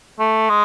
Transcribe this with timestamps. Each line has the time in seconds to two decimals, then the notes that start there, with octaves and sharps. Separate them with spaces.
0.20 A3
0.50 G#3